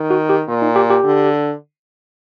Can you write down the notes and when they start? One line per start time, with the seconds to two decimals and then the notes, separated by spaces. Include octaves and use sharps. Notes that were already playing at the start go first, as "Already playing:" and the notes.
Already playing: D#3
0.10 F#4
0.29 G4
0.48 A#2
0.62 D#4
0.76 G4
0.90 G4
1.04 D3